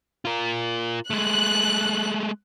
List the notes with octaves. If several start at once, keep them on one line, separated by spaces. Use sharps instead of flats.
F4 A#4
G#3 A3 F#6